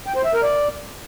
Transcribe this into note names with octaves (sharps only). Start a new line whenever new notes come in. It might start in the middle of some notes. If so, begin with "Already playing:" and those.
G5
C5
E5
A#4
D5